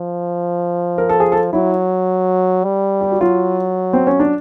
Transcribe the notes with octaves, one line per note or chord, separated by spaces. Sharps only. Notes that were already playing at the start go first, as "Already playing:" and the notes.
Already playing: F3
A#4
A4
G#4
A4
F#3 E4
G3
G4
F#4
F#3 F4
C4
C#4
D4